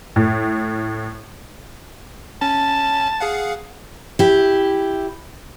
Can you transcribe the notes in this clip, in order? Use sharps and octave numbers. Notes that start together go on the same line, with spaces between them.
A2
C#4 A5
G#4 F5 F#5
E4 G4